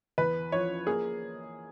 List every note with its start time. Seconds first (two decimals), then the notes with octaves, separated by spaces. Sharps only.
0.18 E2 B4
0.52 F3 C#5
0.87 A#3 G#4